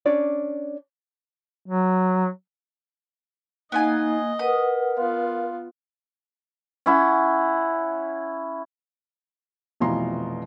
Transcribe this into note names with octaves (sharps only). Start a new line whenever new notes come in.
C#4 D4 D5
F#3
A#3 B3 D#4 F4 D#5 G#5
A#4 B4 F#5 D#6
B3 F4 F5 C6
C#4 E4 F#5
F1 B2 E3 F3 A#5 C6